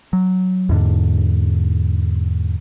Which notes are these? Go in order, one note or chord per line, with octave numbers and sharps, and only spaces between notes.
F#3
E2 G#2 D3